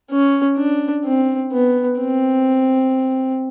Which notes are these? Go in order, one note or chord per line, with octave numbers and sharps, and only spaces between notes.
C#4
D4
C4
B3
C4